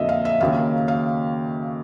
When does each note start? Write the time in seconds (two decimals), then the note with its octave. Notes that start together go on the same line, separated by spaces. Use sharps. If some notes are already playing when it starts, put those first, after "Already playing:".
Already playing: F2 D3 F#3 A#3 D#5 E5
0.09 F5
0.25 E5
0.40 D#2 C#3 F#3 A#3 F5
0.88 F5